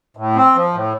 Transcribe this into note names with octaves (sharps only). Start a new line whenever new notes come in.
A2
C4
F3
A2